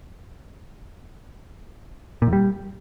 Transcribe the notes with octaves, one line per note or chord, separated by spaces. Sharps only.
A#2
E2
G3